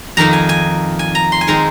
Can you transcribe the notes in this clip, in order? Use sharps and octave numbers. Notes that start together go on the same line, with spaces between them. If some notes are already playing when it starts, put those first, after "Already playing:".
F2 D#3 A#3 A#5
G#5
G#5
G#5
A#5
C6
G#5
D#3 G#3 C4 A#5